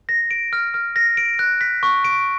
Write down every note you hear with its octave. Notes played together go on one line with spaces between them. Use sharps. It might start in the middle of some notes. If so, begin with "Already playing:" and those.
A#6
D7
F6
F6
A#6
D7
F#6
B6
C#6
D7